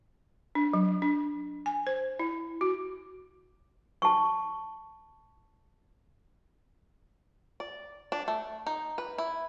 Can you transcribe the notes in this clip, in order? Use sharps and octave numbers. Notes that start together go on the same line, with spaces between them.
D4
F#3
D4
G#5
C5
E4
F#4
A5 C#6
D5
D4
A3
D#4
B4
E4